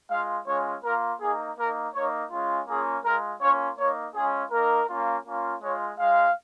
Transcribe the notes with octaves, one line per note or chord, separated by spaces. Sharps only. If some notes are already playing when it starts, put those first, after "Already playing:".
G#3 F4 F5
G#3 C#4 F4 C#5
A#3 F4 A#4
A#3 D#4 G#4
A#3 D#4 A#4
A#3 D#4 C#5
G#3 C#4 F4
A#3 C#4 F4 G#4
G#3 F4 A#4
A#3 C#4 F4 C#5
A#3 D#4 C#5
G#3 C#4 F4 G#4
A#3 D#4 A#4
A#3 C#4 F4
A#3 C#4 F4
G#3 F4 C#5
G#3 F4 F5